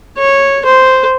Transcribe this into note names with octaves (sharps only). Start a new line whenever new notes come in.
C#5
C5